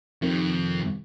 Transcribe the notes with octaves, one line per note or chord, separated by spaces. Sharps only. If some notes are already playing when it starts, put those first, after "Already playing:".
F2 C3 D#3